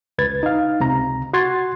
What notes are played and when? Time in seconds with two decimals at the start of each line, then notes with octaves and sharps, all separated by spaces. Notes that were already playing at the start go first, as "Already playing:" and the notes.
0.18 C#2 B4 G#6 A6
0.43 D#4 F5
0.80 C#2 C3 A#5
1.33 F#4 F#5 C6 G#6 A6